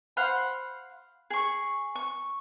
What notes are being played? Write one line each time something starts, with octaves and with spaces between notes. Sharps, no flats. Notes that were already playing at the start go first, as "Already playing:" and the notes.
C5 F5 F#5 B5
G#4 C#6
C#6